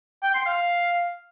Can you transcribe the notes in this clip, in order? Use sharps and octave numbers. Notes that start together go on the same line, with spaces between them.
G5
C6
F5